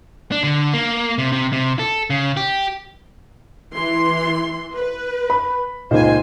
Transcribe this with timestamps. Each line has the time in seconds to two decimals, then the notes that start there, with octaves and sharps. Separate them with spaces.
0.32 D4
0.44 D3
0.74 A#3
1.18 C3
1.32 C3
1.52 C3
1.79 A4
2.10 C#3
2.37 G4
3.75 E3 C6
4.76 B4
5.30 B5
5.91 C#2 A#2 D#3 C5 G#5